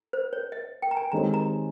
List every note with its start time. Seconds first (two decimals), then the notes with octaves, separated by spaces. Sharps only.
0.13 C5
0.33 C#5
0.52 D#5
0.82 G5
0.91 A#5
0.97 G#5
1.12 D#3 G#3 C4 G4 C#5 A#5
1.34 A#5